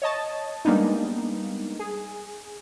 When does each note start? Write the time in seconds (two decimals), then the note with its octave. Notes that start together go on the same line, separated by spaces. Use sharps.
0.02 C#5 D#5 A5
0.65 G3 G#3 A#3 B3 D4 D#4
1.79 G#4